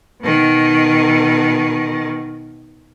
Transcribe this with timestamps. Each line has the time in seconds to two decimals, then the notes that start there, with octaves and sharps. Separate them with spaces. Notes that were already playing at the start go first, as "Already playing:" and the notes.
0.22 B2 D#3